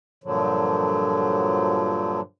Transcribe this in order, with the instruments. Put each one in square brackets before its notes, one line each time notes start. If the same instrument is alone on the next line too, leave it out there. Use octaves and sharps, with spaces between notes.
[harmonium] G2 A#2 D3 F3 F#3